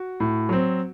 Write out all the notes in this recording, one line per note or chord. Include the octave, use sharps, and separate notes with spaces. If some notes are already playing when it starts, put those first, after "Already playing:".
Already playing: F#4
A2
F#3 C4